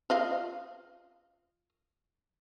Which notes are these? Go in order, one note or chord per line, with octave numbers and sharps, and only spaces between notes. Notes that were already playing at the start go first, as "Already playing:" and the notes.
F4 D#5 F5